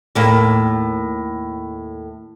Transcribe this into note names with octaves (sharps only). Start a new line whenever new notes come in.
D#2 A2 A#3